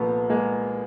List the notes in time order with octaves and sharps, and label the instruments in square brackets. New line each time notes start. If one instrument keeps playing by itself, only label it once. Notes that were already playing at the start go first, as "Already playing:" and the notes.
Already playing: [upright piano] C2 A#2 F3 A3 B3
G#3 A#3